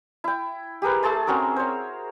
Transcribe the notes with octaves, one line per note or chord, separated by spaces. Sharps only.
E4 G5
G4 G#4 A#4 B4
A3 G#4 A5 C6
C4 C#4 F#4 A#4
C5 C#5